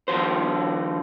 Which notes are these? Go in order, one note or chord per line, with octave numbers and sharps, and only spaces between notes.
D#3 F3 F#4 C5